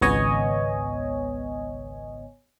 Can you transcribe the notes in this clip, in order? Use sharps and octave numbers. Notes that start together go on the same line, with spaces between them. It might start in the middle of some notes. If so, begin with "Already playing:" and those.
G#1 C#2 B3 C#5 D#5 G#5